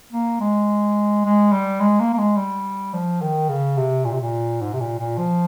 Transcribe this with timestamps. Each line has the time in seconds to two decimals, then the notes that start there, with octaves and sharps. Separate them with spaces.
0.13 A#3
0.40 G#3
1.25 G#3
1.52 G3
1.81 G#3
2.00 A#3
2.14 A#3
2.18 G#3
2.37 G3
2.94 F3
3.22 D#3
3.49 C#3
3.78 C3
4.05 A#2
4.13 C3
4.21 A#2
4.62 G#2
4.74 C3
4.80 A#2
4.99 A#2
5.18 F3